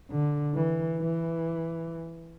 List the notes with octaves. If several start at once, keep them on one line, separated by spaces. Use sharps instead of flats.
D3
E3
E3